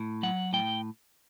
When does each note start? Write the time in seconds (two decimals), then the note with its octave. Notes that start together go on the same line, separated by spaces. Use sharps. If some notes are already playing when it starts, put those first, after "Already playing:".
Already playing: A2
0.23 F#3 F#5
0.53 A2 G5